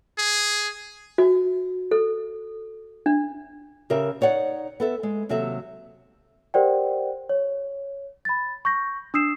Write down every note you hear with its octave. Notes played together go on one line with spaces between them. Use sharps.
G#4
F#4
A4
D4
C#3 G4 A#4 E5
D#4 C#5 D5 F#5
B3 A4 E5
G#3
D#2 C3 F#3 F#4 A4 E5
G4 A#4 C5 D5 F#5 G5
C#5
B5 A6
C#6 G6 A#6
D4 D#6 E6 C7 E7